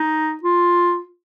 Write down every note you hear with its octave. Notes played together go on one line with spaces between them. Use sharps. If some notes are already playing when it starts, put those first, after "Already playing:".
Already playing: D#4
F4